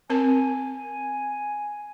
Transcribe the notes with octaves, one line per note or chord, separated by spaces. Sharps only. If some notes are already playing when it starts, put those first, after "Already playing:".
C4 A#4 G#5 A5